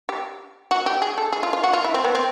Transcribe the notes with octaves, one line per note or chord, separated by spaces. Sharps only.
G4
F#4
G4
G#4
A4
G#4
F4
F4
F#4
F4
E4
C4
B3
C4